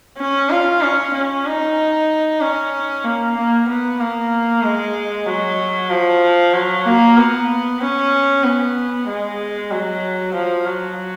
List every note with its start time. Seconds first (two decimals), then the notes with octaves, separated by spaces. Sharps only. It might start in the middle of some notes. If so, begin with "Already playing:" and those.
0.18 C#4
0.50 F4
0.82 C#4
1.14 C#4
1.46 D#4
2.41 C#4
3.05 A#3
3.36 A#3
3.68 B3
4.00 A#3
4.63 G#3
5.26 F#3
5.90 F3
6.54 F#3
6.86 A#3
7.17 B3
7.81 C#4
8.44 B3
9.08 G#3
9.71 F#3
10.35 F3
10.66 F#3